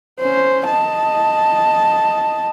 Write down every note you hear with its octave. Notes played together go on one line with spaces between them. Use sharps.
C#4 C5
D#5 A5